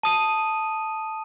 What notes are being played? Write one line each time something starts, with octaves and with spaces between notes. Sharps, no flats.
A5 D#6 D#7